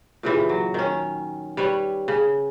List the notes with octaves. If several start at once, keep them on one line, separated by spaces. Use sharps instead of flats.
A#2 C#3 E3 G4
F#3
D#3 C#4
G3 B4 C#5
C#3